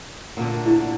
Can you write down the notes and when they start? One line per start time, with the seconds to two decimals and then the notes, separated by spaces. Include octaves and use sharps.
0.37 A#2 D3 A3
0.66 E4